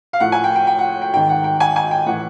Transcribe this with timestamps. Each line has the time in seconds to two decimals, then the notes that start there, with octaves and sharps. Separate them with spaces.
0.13 F5
0.20 A2 F3 F#5
0.32 G#5
0.44 G5
0.55 G5
0.67 G5
0.79 F#5
1.02 G5
1.13 G#2 D#3 G5
1.29 F#5
1.44 G5
1.60 G#5
1.76 G#5
1.91 G5
2.06 A2 E3 F#5